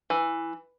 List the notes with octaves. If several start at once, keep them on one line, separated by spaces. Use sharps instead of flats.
E3